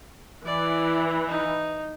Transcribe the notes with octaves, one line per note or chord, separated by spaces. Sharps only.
E3 D5
D#4